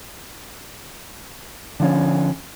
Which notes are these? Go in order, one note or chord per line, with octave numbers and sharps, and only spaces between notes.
D3 F3 C#4